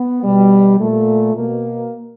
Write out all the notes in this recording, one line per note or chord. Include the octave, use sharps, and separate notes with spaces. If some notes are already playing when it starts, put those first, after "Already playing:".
Already playing: B3
B2 G3
A#2 A3
B2 A#3